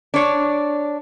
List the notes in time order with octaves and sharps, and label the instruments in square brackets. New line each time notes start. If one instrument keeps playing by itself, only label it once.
[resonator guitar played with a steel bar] D4 C#5